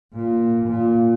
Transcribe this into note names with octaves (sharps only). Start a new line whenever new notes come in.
A#2
A#2